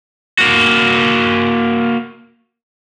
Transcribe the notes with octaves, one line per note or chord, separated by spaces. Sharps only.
A#3 F#4